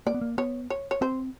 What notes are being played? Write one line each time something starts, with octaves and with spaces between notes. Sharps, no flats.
A#3 D5
B3
A#3
B3 C#5
C#5
C#5
C4 C5